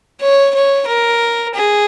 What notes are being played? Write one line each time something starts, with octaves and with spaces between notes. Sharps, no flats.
C#5
C#5
A#4
G#4